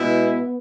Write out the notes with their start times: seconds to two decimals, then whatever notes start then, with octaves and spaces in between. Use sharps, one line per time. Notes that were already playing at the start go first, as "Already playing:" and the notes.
Already playing: B2 G#3 B3 E4